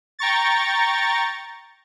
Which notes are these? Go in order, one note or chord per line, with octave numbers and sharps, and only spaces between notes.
G5 A#5 C#6 A6